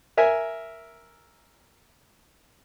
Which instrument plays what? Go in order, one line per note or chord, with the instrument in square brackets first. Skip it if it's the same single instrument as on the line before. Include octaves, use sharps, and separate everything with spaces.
[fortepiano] A#4 E5 G#5